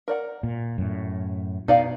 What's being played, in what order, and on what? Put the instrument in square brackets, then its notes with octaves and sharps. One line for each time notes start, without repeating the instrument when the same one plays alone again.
[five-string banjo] A#4 D5 F#5
[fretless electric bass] A#2
F#2 A2
[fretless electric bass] B2 [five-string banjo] D#4 D5 F5